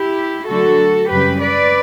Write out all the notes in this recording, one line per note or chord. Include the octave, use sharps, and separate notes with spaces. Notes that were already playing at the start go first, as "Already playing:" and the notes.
Already playing: E4 G4
D3 F#3 A3 F#4 A4
F#2 C#3 G3 G4 B4
B4 D5